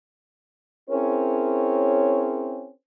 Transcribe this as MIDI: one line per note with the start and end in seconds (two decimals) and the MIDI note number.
0.89 2.68 60
0.89 2.68 61
0.89 2.68 64
0.89 2.68 68
0.89 2.68 70
0.89 2.68 73